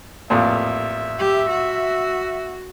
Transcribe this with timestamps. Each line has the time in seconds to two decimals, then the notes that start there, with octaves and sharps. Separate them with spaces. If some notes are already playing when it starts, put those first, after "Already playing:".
0.30 A1 F2 A#2 E5
1.19 G4
1.50 F#4